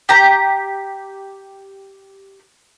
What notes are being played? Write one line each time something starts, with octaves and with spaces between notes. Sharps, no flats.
G4 A#5